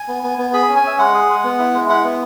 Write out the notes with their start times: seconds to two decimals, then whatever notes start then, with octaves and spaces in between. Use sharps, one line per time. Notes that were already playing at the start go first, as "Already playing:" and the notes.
Already playing: G#5
0.08 B3
0.23 B3
0.38 B3
0.53 G#4 B5
0.69 C#4
0.76 G#5
0.83 C#4 E5
0.99 G#3 F#5
1.14 G#4
1.29 G#3
1.44 B3
1.59 E4
1.74 G#3
1.89 E4 F#5
2.04 B3